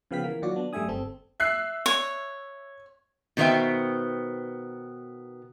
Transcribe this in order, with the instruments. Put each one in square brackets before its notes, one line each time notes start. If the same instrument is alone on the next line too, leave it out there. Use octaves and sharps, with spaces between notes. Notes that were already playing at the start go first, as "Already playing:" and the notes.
[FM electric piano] C#3 F3 B3 F5 G5 B6
E3 A#3
D#3 F#3 F4 F#4 D5
B3 D4
F#2 G3 A3 E5 G#5 D#6
G1 C4 A4
[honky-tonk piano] E5 F#6 C7
[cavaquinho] C#5
[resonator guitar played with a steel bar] B2 D#3 B3 C5 E5 G5